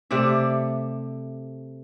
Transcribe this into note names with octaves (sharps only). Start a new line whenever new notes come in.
C3 A3 D5 E5